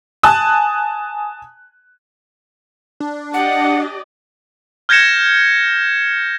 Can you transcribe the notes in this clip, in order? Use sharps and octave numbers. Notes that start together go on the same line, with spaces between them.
G#5 A5 D#6 F#6
D4
G4 D5 D#5 F#5
F6 G6 G#6 A#6 C#7 E7